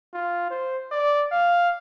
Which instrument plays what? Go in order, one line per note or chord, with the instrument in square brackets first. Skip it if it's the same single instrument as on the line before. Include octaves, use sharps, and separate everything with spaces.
[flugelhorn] F4
C5
D5
F5